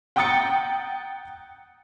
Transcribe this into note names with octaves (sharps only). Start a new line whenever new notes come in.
F#5 G5 A#5 D#6 A6 C#7